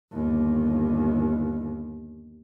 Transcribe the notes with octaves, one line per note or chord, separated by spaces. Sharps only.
G1 D#2